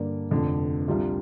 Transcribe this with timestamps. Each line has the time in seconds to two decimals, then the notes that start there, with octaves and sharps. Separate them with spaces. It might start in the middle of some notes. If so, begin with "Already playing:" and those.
Already playing: G2 D3 A#3 D5
0.31 F1 F2 D3
0.88 C2 C3 G3 D4 F4